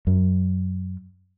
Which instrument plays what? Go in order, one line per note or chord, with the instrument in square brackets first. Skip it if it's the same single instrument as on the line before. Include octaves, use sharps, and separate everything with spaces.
[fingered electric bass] F#2